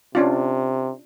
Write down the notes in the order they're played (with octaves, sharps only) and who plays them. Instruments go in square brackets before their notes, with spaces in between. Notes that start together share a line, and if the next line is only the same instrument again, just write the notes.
[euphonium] C3 [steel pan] C#4 D4 F4